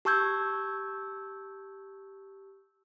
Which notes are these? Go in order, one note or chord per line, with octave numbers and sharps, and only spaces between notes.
G4 A5 C#6 E6 G6 G#6